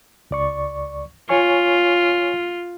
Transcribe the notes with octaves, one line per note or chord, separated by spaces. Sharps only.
C#2 D5 C#6
F4 C#5 G#5 C#6